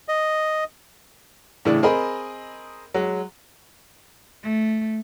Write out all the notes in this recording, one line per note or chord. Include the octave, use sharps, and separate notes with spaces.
D#5
A2 C#3 E3 D4
C4 G#4 A#4 D#5 B5
F#3 G#3
A3